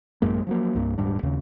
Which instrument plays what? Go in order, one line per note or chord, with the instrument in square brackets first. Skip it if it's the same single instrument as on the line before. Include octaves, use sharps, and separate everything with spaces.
[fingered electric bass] A1 F#2 G#3 A#3
F3 F#3 A#3
C2 G2 A#3
D#1 G#2 G3 D4
D#2 C#3